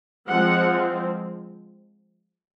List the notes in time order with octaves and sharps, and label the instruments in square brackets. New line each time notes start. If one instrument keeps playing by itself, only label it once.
[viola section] F3 G#3 C4 F#5